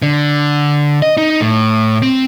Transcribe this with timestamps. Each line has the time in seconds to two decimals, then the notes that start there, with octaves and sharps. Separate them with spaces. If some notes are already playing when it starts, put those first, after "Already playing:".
0.02 D3
1.02 D#5
1.17 D#4
1.41 A2
2.02 C4